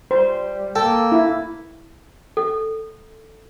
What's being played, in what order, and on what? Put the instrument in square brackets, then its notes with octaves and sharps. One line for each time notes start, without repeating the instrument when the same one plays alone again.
[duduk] G3 [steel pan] C5
[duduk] A#3 [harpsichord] A4 [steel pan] G5
[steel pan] E4
[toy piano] A4